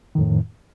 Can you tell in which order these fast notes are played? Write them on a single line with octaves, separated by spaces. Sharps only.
D#3 F2 A2